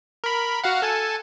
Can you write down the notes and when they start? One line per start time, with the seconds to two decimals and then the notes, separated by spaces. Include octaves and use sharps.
0.24 A#4 B5
0.64 F#4 F5 F#5
0.82 A4 G#5 A5